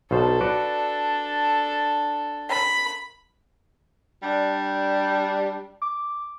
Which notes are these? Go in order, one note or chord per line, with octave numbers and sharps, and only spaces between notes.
B1 B2 D4 A4 C5
F#4 B4 D5
B5
G3 D4
D6